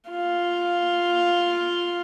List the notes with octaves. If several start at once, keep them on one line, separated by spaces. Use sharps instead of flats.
F4